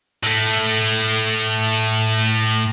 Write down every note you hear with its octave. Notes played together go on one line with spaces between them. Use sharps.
A2 A3